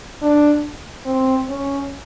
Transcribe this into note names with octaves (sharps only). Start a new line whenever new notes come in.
D4
C4
C#4